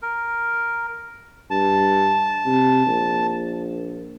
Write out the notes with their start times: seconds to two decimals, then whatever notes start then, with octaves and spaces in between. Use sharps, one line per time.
0.02 A#4
1.50 G2 A5
2.46 C3
2.86 A#1